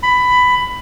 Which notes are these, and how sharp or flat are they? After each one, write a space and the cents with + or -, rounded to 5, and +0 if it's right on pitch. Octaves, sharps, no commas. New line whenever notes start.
B5 +15